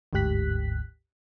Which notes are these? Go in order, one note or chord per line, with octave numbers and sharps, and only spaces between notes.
G1 D2 G#2 G4 F#6 B6